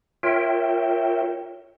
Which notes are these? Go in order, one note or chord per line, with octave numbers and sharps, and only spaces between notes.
F4 A#4 C#5 E5 G5